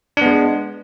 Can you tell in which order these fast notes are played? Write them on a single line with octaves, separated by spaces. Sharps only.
D4 B3 G#3